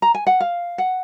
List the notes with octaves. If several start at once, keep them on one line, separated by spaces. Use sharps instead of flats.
A#5
G#5
F#5
F5
F#5